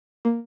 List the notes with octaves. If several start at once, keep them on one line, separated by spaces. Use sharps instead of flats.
A#3